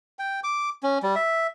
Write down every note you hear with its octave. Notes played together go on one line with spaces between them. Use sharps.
G5
D6
C#4
G3
E5